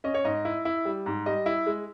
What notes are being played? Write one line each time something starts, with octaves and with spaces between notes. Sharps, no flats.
C#4 D#5
C#5
G#2 D#5
E4
E4
G3
G#2
G3 D#5
E4
G#3